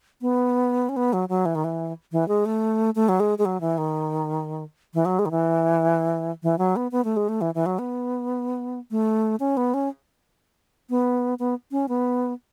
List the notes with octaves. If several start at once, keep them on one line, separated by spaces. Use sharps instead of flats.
B3
C#4
B3
F#3
F#3
E3
D#3
E3
E3
G#3
A3
A3
F#3
G#3
G#3
F#3
E3
D#3
E3
F#3
G#3
D#3
E3
E3
F#3
B3
B3
A3
G#3
A3
E3
E3
F#3
B3
A3
C#4
B3
C#4
B3
B3
C#4
B3